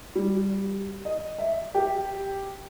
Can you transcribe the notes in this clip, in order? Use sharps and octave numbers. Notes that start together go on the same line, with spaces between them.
G3
D#5
E5
G4